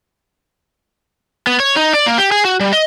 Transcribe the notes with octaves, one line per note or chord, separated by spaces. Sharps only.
B3
C#5
D#4
D5
A#3
G4
G#4
F#4
G3
D#5